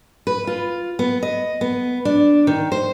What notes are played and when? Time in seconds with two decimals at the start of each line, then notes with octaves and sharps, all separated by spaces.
0.27 B4
0.47 F4
0.99 B3
1.23 D#5
1.61 B3
2.05 D4
2.47 D#3
2.72 C5